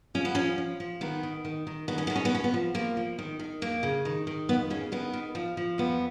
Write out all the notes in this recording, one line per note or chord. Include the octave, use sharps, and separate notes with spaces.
F3 C#4
B3
F3 C#4
F3
F3
D#3 B3
D#3
D#3
D#3
D#3 B3
C#4
D#3 B3
C#4
B3
F3 C#4
B3
F3
F3 A#3
F3
D#3
D#3
F2 A#3
C#3
D#3
D#3
F2 B3
C#3 C#4
D#3 B3
D#3
F3
F3
F2 B3